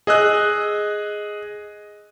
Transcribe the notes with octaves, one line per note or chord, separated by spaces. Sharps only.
G#4 D#5 E6 F#6